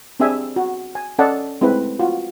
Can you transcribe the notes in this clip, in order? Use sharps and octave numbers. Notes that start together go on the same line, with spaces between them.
C4 D4 G4 G#4 E5 G#5
F#4
G#5
C#4 A4 D5 D#5 F#5 A5
G#3 A3 C4 E4 B4
F4 F#4